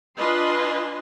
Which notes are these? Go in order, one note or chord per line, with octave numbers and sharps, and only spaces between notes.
D4 F4 B4 D#5 G#5 C6